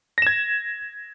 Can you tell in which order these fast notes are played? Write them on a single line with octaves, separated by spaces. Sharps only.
A#6 E7 G#6